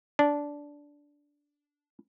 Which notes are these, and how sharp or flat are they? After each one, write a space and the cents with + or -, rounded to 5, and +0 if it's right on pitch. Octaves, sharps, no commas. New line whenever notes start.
D4 -10